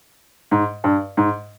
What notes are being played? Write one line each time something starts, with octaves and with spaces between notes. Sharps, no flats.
G#2
G2
G#2